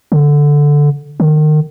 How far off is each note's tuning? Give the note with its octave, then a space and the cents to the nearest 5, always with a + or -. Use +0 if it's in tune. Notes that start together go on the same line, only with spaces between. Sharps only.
D3 -5
D#3 -30